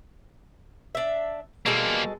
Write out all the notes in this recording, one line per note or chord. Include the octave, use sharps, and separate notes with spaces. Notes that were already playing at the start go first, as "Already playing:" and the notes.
D4 E5
B2 G3 G#3 A#3 A4